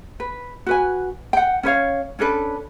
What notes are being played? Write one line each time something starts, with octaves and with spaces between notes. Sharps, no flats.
B4
F#4 B4 G#5
F#5 G5
C#4 B4 C#5 F5
C#4 D4 A4 B4